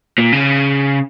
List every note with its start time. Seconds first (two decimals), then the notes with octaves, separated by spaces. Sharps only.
0.18 A#2
0.32 C#3